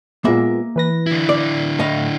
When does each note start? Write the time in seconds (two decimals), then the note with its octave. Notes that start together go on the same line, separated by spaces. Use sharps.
0.25 A#2 G#3 A#3 B3 E5
0.76 E3 B4 A#6
1.07 D3 E4
1.29 D5
1.79 A2 D#5 F5